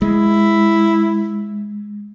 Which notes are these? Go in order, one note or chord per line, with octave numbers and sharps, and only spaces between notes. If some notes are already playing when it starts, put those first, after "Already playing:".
G#3 E4